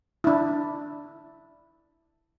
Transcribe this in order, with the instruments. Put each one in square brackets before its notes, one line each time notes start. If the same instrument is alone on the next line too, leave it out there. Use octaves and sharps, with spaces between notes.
[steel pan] D4 E4